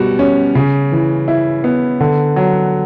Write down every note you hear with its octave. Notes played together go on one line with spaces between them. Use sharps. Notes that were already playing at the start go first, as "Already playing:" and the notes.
Already playing: B2 G3 F#4
C#4
C#3
E3
E4
B3
D3
F#3